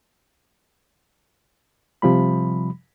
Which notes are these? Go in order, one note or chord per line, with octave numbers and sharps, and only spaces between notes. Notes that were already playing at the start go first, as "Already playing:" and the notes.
C3 F3 G3 B5